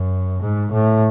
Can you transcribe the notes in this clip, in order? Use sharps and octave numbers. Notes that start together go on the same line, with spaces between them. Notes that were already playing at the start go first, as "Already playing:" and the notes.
Already playing: F#2
G#2
A2